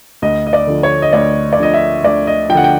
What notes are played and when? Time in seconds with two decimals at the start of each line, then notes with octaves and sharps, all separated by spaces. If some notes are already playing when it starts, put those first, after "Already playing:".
0.22 D2 D#5
0.47 D#5
0.53 D5
0.67 D3 F3
0.83 C#5
1.02 D#5
1.13 D2 D5
1.53 D5
1.58 D3 F3 D#5
1.73 E5
2.04 D2 D5
2.27 D#5
2.49 F3 G5
2.54 D3 F#5
2.64 G5